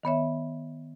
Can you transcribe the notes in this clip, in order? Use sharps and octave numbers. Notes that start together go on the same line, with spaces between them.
D#3 B3 C#5 E5